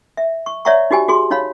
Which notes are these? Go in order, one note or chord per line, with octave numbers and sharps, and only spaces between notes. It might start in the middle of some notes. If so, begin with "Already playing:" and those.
E5
C#6
C#5 D5 E5 F#5 A#5 C#6
D#4 F#4 G4 G#5
F#4 G#4 C6
D#4 C#5 F5 B5